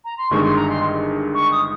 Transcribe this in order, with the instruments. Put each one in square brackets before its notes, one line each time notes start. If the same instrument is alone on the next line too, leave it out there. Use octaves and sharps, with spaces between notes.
[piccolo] A#5
C6
[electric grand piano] G1 G2 D#3 G#3 D#4 [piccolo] C#6
[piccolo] C6
A#5
C6
C#6
D#6